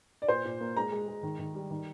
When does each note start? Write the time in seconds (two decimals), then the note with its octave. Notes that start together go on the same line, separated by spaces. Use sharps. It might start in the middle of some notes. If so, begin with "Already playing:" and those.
0.22 D5
0.28 A#2 C5
0.45 A#2
0.60 A#3
0.77 G#3 A#5
0.92 G#3
1.08 G#3
1.23 D#3
1.39 D#3
1.55 G3
1.71 D#3